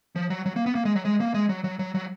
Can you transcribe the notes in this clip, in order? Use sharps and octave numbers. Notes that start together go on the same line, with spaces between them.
F3
F#3
F#3
A#3
B3
A#3
G#3
F#3
G#3
A#3
G#3
F#3
F#3
F#3
F#3